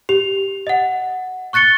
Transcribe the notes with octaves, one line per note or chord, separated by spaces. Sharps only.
G4 F7
D#5 F#5
C#6 F#6 A6 C#7 G7